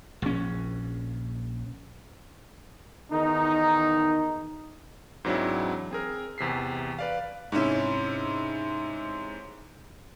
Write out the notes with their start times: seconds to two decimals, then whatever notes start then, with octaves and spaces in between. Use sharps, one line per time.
0.22 A#1 C#4
3.11 E2 D#3 D#4
5.25 G#2 E3 F#3 C4 D4 E4
5.91 C4 G#4 A#4
6.38 E2 C3 B6 C7
6.99 B4 D5 F5
7.52 G#2 C3 C#4 E4